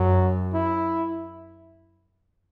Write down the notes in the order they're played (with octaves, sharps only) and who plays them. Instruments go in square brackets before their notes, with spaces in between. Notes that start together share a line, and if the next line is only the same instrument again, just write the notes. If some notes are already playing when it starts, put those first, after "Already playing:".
Already playing: [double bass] F#2 [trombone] F#3
[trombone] E4